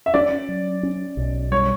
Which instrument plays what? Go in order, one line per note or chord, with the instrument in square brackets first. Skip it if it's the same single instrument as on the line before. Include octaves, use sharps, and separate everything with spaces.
[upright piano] E5
[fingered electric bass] C#4 [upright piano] D5
[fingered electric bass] F#3
C#4
B1
[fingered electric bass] G3 [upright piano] C#5